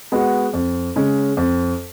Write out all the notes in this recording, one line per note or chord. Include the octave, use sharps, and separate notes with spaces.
G#3 B3 F#4
F2
C#3 G#3 C#4
F2